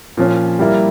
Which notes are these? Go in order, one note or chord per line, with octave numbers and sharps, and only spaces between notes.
A#2 F3 C#4
G3 A#3 E4 A#4